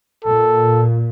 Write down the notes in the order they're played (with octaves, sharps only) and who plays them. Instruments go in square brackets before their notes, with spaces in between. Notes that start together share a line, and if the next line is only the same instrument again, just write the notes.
[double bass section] A#2 [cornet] A4